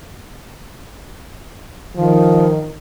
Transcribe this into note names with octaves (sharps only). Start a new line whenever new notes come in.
D#3 F3